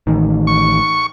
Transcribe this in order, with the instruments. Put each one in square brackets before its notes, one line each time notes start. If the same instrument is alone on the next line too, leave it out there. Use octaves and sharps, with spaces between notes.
[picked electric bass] A1 D#3
[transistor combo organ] C#6